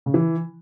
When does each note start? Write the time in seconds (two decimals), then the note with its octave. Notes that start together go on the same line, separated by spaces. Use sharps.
0.06 C#3
0.14 E3